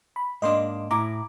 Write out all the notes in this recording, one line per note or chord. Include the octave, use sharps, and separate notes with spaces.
B5
G#2 A#3 D4 D#5 C6
A2 E4 A#5 D6